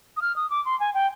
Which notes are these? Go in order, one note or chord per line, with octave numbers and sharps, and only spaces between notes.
D#6
F6
D#6
D6
C6
G#5
G5